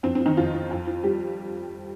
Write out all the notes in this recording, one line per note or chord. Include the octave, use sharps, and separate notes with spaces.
F2 C4
C4
F3
D#3 D#4
F2 F3 F4
F3
F2
F3
G3 G4